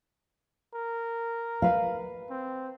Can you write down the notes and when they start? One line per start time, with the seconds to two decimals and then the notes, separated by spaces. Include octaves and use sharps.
0.74 A#4
1.62 B4 F5
2.30 C4